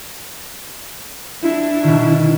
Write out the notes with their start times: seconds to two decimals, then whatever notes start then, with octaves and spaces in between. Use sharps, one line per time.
1.42 D4 E4
1.84 B2 D#3